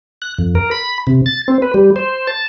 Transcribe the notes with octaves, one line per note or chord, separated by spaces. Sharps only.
F#6
F2
A#4
B5
C3
A6
C4
B4
G3
C5
A5